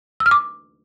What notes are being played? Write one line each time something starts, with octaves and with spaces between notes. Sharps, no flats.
E6
F6
D6